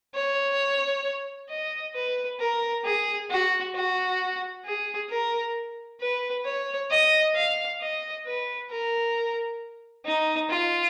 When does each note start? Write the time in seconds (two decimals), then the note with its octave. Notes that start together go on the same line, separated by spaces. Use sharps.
0.15 C#5
1.49 D#5
1.94 B4
2.40 A#4
2.84 G#4
3.30 F#4
3.75 F#4
4.65 G#4
5.10 A#4
6.00 B4
6.45 C#5
6.90 D#5
7.35 F5
7.81 D#5
8.25 B4
8.70 A#4
10.05 D#4
10.50 F4